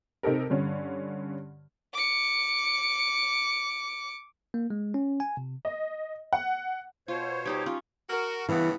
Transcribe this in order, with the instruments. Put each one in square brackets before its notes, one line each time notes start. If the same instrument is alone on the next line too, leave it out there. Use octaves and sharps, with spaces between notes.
[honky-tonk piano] C3 D#4 G4 A4 A#4
G2 D3 C#4
[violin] D6 C#7
[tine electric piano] A#3
G#3
C#4
G#5
C3
[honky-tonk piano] D#5
F#5
[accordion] B2 C5 C#5 [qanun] F4
[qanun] G3 D#4 G4
C#4 F4
[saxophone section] F#4 A#4
[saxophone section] G2 C#3 B3 [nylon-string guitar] E3